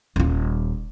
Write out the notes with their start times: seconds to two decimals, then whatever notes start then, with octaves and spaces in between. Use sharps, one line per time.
0.16 D#1 F4